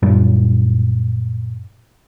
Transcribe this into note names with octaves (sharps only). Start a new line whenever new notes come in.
F#2 A#2 G3